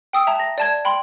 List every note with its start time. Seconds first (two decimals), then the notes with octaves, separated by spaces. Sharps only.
0.13 G5 D#6 E6
0.27 E5 A5 A#5
0.40 A#6
0.58 D5 A5 G#6
0.85 G5 B5 C6